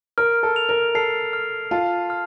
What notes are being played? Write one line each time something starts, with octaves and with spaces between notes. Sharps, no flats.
A#4 F6
A4
F7
A#4
A4 C7
F6
F4 A5
F6